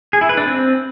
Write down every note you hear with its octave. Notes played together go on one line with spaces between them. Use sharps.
G#4
E4
B4
D4
C4